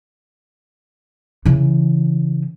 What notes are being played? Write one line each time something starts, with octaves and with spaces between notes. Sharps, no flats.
C#3 E3